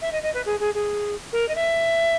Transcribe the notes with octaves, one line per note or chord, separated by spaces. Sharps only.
E5
D#5
D#5
B4
G#4
G#4
G#4
A#4
D#5
E5